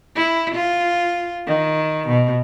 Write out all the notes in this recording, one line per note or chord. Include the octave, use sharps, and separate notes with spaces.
E4
F4
D#3
B2